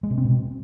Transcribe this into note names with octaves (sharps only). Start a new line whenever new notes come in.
G#3
C3
C4
B2